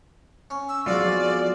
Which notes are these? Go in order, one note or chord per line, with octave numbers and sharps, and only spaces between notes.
C#4
E6
B1 F2 G#3 F4 F#4 D5